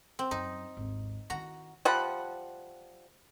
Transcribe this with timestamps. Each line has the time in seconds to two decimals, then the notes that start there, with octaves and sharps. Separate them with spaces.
0.19 C4
0.31 F#2 D#4
0.77 G#1 D#2
1.30 D#3 E4 F#4 A#5
1.85 F3 G3 F#5 B5